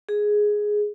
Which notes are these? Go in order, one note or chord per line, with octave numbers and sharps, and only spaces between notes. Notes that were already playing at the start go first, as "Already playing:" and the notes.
G#4